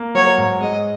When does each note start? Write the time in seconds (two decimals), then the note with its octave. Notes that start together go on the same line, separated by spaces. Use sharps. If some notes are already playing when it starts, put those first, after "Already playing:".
Already playing: A#3
0.15 F#3 C#5
0.38 G#2
0.61 G#3 D#5